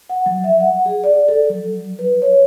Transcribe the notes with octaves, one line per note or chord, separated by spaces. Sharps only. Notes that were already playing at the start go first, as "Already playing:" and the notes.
F#5
F#3
E5
F#5
G#4
D5
A4
F#3
B4
C#5